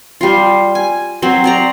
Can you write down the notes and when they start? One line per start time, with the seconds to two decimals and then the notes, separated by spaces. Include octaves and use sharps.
0.21 G3 F4
0.75 G#5
1.22 F#3 C4
1.44 C5 D5 A#5